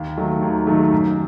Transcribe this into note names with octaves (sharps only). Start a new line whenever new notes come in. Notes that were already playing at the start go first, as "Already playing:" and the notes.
Already playing: D#2
D#3 F#3 A3
D#2
D#3 F#3 A3
F#2